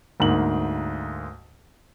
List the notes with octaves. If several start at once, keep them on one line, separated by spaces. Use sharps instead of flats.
D2 G#2 A#3 F#7